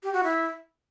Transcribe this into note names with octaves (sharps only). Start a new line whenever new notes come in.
G4
F#4
E4